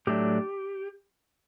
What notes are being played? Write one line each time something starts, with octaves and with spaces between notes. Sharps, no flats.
A2 F#3 A3 D4 G4